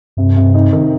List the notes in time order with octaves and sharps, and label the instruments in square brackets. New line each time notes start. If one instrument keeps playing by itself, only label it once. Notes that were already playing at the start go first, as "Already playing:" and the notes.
[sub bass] G2 [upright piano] C3
[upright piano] C3
D#4
D#3